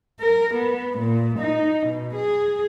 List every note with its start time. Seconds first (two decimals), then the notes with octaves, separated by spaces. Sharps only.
0.20 A#4
0.54 B3
0.99 A#2
1.39 D#4
1.86 B2
2.15 G#4